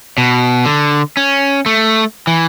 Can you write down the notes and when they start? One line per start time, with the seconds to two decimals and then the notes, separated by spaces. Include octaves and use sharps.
0.18 B2
0.65 D3
1.17 C#4
1.66 A3
2.27 E3